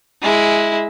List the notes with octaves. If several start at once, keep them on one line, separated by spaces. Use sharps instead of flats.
G#3 E4